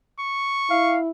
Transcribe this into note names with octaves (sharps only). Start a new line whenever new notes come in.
C#6
E4 F5